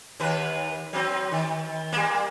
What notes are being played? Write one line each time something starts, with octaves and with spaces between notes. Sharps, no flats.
D#2 B4
F#3 C4
D#3
G3 A#3